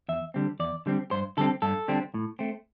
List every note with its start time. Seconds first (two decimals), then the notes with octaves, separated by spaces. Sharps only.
0.09 E2 E5
0.34 D3 G3 C4
0.60 E2 D5
0.86 D3 G3 C4
1.11 G2 C5
1.37 D3 G3 C4 A4
1.62 G2 A4
1.88 D3 G3 C4
2.14 A2
2.39 A3 C4